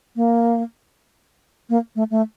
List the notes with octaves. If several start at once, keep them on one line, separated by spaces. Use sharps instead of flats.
A#3
A#3
A3
A3